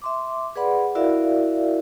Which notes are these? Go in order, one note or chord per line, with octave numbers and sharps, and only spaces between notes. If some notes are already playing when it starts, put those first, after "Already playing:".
E5 C6 D6
G#4 B4 D5 F#5 B5
E4 F#4 A#4 D5 E5 F5